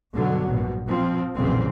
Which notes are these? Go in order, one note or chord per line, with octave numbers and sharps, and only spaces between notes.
B1 G2 D3 F#3
A#1 B2
F3 C4
F1 B1 A#2 C#3 E3 C4